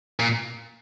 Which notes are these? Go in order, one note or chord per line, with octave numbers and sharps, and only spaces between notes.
A#2